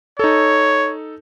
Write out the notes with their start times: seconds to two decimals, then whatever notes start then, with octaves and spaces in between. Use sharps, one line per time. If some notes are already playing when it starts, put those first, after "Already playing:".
0.19 D#4 A4 C#5